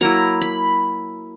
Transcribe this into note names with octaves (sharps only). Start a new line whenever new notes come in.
F#3 A#3 E4 A#5
B5